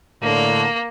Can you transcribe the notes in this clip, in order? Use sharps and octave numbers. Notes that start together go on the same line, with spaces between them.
A2 D3 A#3